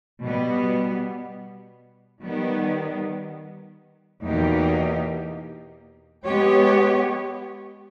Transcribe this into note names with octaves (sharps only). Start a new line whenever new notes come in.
B2 G3 B3
D#3 G3 B3
E2 B2 A#3 D#4 G4
G#3 B3 G4 C#5